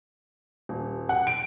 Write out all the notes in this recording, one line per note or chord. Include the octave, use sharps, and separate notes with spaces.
D#1
F#5
D7